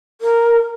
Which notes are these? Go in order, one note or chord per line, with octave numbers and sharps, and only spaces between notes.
A#4